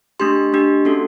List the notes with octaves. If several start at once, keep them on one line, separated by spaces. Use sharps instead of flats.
A3 D4 G4 C6
A3 D4 G4
A#3 C#4 F#4 A4